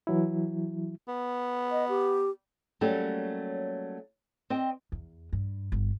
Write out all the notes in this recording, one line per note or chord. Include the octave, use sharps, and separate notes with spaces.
E3 F#3 E4
B3
D#5
G4
F#3 G3 A3 A#3 C#4 G4
C4 D#5 G5
E2
G2
G1